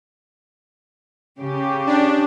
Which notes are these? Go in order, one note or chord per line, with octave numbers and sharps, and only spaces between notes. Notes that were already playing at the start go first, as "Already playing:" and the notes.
C#3 G4
D4